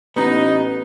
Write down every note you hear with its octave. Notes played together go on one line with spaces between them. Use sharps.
A1 B3 D#4